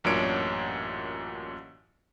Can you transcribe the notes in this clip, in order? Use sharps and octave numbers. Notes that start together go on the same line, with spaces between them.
A1 F#2 A#2 D4 C#5 D7